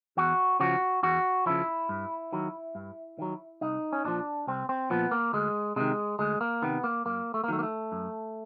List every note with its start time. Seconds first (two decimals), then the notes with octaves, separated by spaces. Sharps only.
0.17 E2 F#4
0.60 C#3 F3 F#4
1.03 E2 F#4
1.46 C#3 F3 E4
1.89 G2
2.32 D#3 F#3
2.75 G2
3.18 D#3 F#3
3.61 C2 D#4
3.93 C#4
4.05 A#2 F3 D4
4.47 C2 C4
4.69 C4
4.90 A#2 F3 B3
5.11 A#3
5.33 D2 G#3
5.76 C3 D#3 G#3
6.19 D2 G#3
6.41 A#3
6.62 C3 D#3 B3
6.84 A#3
7.05 F#2 A#3
7.34 A3
7.44 A#3
7.48 D#3 F#3 A3
7.59 A#3
7.63 A3
7.92 F#2